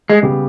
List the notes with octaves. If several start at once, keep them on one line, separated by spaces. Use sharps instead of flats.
G#3
C#3 G3 B3 G4